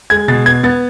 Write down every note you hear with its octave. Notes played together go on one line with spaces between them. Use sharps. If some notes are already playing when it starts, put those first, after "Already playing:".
G#3 G#6
B2 A6
B3 G#6
B3 A6